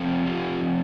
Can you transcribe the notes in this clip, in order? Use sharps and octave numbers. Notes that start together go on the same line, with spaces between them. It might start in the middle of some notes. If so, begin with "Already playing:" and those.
Already playing: F3 A3 C4
F4 G4